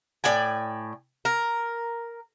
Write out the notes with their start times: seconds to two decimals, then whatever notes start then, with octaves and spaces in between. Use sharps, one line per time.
0.24 A2 D5 G5 G#5
1.25 A#4